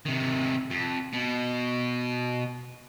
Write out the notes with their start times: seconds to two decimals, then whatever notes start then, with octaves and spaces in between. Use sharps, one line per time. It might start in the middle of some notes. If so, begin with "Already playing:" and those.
0.06 C3 D#3
0.70 F2
1.13 B2